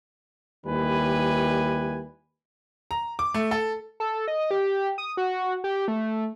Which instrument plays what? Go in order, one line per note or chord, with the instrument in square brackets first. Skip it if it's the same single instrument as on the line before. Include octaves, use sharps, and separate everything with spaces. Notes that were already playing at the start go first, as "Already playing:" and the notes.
[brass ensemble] D#2 D#3 G3 E4 B4 G#5
[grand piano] A#5
D6
A3
A4
[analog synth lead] A4
D#5
G4
D#6
F#4
G4
A3